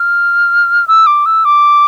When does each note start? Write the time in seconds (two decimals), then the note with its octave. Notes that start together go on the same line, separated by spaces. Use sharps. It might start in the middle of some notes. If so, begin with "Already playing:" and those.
Already playing: F6
0.88 E6
1.06 D6
1.26 E6
1.45 D6